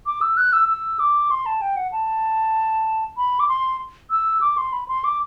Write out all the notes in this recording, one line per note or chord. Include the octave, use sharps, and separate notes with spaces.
D6
E6
F#6
E6
E6
D6
C6
A5
G5
F#5
A5
B5
D6
C6
E6
D6
C6
B5
C6
D6